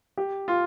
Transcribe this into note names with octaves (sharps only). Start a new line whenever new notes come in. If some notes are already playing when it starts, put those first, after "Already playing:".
G4
F4